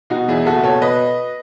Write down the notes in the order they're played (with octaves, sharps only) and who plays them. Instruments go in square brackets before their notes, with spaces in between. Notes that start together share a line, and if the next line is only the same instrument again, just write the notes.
[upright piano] B2 D#4 F#4
E2 E4 G#4
F#1 F#4 A4
B2 A4 C#5
B4 D#5